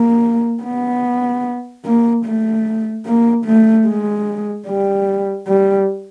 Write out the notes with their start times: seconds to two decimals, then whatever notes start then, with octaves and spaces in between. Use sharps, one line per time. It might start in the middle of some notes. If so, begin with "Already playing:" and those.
Already playing: A#3
0.64 B3
1.85 A#3
2.25 A3
3.06 A#3
3.45 A3
3.86 G#3
4.67 G3
5.47 G3